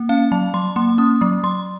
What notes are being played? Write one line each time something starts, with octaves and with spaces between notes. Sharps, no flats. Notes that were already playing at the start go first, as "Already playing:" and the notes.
Already playing: A#3
C#4 F5
F#3 A5
F#3 C6
A#3 C6
C#4 D#6
F#3 D#6
F#3 C6